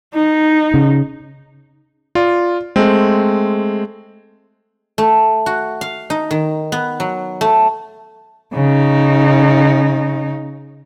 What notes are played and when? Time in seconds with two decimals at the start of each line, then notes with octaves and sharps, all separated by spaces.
0.14 D#4
0.74 C#3
2.15 F4 D5
2.76 G#3 A3 C4
4.98 A3
5.46 F#4
5.81 F5
6.10 D#4
6.31 D#3
6.72 B3
7.00 F#3
7.41 A3
8.54 C#3 D#4